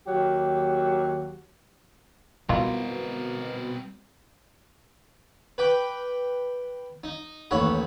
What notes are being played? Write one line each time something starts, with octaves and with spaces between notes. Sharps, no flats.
D#2 F#3 G4
B2 E3 G3 B3 C4 F4 A#4
B4 G5 D6
D#4
A1 D#2 C#5 F#5 B5